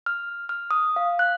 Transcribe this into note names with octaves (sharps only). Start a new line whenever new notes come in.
F6
F6
D#6
F5
F#6